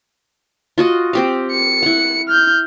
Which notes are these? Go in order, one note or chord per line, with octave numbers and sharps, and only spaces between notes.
F4 F#4 D#5
C4 G4 F5
C#7
E4 F#5
F6 G6